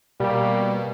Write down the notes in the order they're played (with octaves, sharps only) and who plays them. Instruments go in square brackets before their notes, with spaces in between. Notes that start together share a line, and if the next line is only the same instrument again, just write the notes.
[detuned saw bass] B2 [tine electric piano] G3 G4 [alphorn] A#3